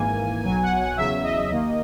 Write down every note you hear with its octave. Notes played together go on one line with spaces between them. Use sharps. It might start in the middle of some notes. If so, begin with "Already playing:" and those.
Already playing: G#1 G#2 E3 A#3 G#5
B1 B2 F#3 G#5
F#5
F#5
E2 C#3 F#3 E5
D#5
D#2 D#3 A#3